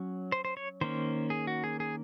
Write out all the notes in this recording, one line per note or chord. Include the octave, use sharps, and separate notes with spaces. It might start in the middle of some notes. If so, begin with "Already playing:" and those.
Already playing: F#3 C#4
C5
C5
C#5
D#3 A#3 C#4 C5
G#4
F#4
G#4
G#4